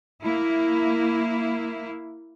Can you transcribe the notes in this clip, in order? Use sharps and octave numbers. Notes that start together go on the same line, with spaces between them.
A#3 E4